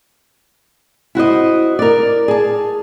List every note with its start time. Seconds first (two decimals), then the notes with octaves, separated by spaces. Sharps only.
1.15 E4 F#4 C5 D#5
1.79 A#4 D5
2.28 G#4 A5